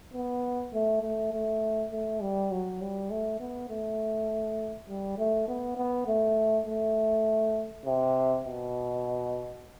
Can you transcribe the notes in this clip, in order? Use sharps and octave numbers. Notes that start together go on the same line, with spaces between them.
B3
A3
A3
A3
A3
G3
F#3
G3
A3
B3
A3
G3
A3
B3
B3
A3
A3
C3
B2